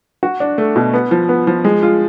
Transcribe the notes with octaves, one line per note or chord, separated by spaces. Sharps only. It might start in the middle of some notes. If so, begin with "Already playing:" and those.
F#4
D4
A3
B2
B3
F3
B3
F3
G#3
F4